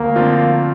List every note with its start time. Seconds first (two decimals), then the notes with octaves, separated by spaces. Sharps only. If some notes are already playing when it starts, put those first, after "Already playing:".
Already playing: D2 A#3
0.16 D3 F3 C4 F4